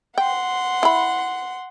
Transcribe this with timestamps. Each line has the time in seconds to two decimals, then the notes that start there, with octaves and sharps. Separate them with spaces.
0.18 F#5 G5 C6
0.83 E4 B5